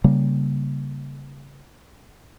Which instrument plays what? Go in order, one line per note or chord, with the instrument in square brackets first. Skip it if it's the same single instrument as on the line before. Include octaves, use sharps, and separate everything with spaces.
[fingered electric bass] C#3 G3 A#3